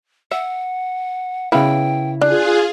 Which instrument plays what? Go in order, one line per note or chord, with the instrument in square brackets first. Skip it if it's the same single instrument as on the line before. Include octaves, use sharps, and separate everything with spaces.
[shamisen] E5 [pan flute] F#5
[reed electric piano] C#3 E4 [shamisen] B3 B4 F5 [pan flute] G5
[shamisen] D4 [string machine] F4 G#4 [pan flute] F#6